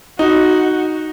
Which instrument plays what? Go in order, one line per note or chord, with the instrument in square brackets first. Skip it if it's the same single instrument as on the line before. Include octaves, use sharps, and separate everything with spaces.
[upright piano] D#4 [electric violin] F#4